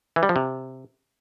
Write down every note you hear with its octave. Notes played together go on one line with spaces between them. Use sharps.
E3
G3
F3
C3